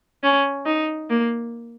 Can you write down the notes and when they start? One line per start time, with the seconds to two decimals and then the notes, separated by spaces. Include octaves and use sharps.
0.23 C#4
0.66 D#4
1.10 A#3